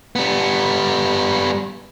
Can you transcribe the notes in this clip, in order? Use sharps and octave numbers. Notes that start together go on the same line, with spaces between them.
G3 B3